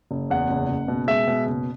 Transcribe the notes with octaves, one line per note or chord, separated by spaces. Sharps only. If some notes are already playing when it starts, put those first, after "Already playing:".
F#1
E2 F#5
F#1
F#1
B2
G#3 E5
B2
F#1